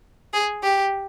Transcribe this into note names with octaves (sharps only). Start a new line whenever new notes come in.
G#4
G4